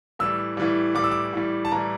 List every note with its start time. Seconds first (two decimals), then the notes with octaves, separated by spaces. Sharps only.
0.19 A2 E3 G3 E6
0.57 A2 E3 G3
0.95 A2 E3 G3 D6
1.04 E6
1.11 D6
1.33 A2 E3 G3
1.65 A5
1.71 A2 E3 G3 A#5